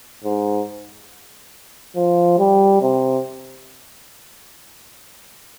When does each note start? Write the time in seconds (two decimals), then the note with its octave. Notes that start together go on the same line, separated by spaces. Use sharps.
0.24 G#2
1.96 F3
2.38 G3
2.81 C3